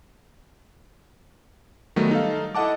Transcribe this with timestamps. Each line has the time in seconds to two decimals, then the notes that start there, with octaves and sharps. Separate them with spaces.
1.96 D#3 F#3 G3 A3 B3
2.11 D#4 A4 F5
2.55 E4 A4 D#5 F#5 A5 D6